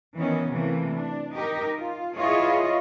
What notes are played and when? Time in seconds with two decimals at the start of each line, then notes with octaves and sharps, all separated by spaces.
0.14 D#3 E3 B3 C#4
0.50 C3 E3 A3 A#3
0.91 D4
1.32 D#4 G4 A#4
1.77 F4
2.17 E4 F4 G#4 B4 C#5 D#5